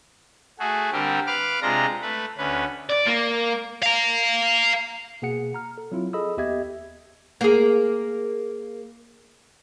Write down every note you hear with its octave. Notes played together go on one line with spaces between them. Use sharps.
A3 F#4 G#4
D3 G3 C4 G4 A#4
B4 F5 D6 F6
C3 G#3 D4 F4 A#5
A3 B4
D2 C#4 B4
D5
A#3
F5 A#5
B2 A#3 G#4 F#5 C#7
A#5 F6
A4
F#3 C4 E4 F4
G#4 A4 D#5 B5 D#6 E6
D#2 B3 G4 D#5 E5 G#6
A#3 G#4